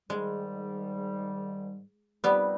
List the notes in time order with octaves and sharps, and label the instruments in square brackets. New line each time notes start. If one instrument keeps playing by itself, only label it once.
[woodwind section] G#2 D#3 G3 [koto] G#3
[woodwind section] F2 C3 F3 C4 D#4 [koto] G3 B3